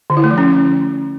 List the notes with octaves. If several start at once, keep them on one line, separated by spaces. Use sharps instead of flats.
D3
E4
A3
F3
C#4